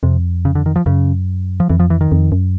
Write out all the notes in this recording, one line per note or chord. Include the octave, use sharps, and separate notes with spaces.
F2 C3
C#3
D3
D#3
F3
F#2 C#3
F3
F2 E3
F3
E3
D#3
F2
F#2